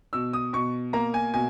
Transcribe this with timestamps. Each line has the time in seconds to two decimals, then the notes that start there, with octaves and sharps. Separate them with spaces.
0.13 B2 E6
0.33 D#6
0.53 B2 C#6
0.93 A#3 A#5
1.14 G#5
1.34 B2 G#5